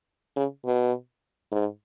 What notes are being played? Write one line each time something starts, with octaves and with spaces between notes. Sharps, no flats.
C#3
B2
G#2